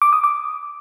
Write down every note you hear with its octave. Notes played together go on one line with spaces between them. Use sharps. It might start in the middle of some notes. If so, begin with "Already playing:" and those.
D6
D#6
D6